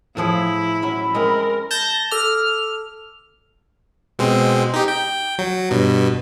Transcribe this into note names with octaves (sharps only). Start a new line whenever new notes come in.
A2 F3 E4 G#4
F#3 C#4 E5 B5
G#3 C4 A#4
A5 G6 A#6
A4 D6 F6
B2 G#3 C4
D#4 G4
G5
F#3
G2 B2